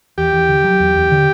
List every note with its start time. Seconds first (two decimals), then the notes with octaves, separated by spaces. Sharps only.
0.18 E2 G4
0.33 E2
0.49 D3
0.64 F#3
0.80 E2
0.96 E2
1.11 D3